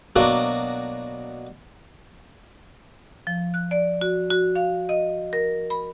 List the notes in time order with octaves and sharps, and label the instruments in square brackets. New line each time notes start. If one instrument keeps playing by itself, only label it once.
[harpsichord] B2 F#3 A#3 D4 F#4
[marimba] F3
F#6
D5
F#4
F#4
F5
D#5
A#4
B5